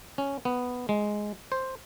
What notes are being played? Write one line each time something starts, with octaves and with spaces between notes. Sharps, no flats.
C#4
B3
G#3
C5